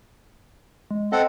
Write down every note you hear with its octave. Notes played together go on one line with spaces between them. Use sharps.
G#3
C4 A4 D#5 F#5